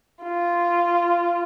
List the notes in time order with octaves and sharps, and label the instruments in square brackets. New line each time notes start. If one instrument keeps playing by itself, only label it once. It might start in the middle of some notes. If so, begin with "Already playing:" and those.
[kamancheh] F4